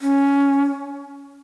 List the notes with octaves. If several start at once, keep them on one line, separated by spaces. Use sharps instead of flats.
C#4